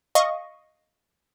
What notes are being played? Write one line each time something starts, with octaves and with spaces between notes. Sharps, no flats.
D#5 F5 C#6